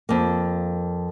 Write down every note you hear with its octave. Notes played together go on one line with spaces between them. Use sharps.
F2 A#3